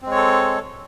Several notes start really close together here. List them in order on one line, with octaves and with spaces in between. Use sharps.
C4 G#3 C#5 A4